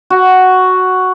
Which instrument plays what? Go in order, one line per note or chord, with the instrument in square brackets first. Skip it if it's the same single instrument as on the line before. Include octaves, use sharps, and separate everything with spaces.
[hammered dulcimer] F#4